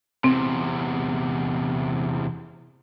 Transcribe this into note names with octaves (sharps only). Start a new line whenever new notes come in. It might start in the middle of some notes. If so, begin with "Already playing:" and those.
E2 C3 C4